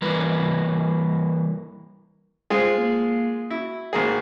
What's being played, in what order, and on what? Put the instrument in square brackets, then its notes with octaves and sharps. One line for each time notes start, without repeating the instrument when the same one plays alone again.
[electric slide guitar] E3 G3 A#3 A#4 B4
[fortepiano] G#3 F4 G#4 [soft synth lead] C5
[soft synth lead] A#3
[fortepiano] E4 [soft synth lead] F#4
[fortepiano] G#1 A#3 G#4